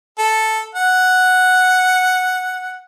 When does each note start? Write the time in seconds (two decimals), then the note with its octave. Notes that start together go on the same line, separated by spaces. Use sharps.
0.19 A4
0.75 F#5